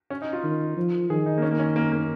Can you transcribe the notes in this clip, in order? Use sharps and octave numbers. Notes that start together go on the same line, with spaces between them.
C#4
D#4
F4
D#3
F3
D#3 G#4
D#4
A#3
C#4
A#3
C#4
A#3
A#3